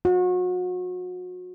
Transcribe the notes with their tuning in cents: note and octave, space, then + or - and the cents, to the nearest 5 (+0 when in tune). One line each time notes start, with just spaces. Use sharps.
F#4 -35